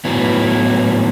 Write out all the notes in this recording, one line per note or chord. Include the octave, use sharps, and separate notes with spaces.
A2 F#3 B3 E4